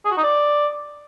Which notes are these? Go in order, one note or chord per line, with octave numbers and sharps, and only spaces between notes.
G#4
F#4
D#4
D5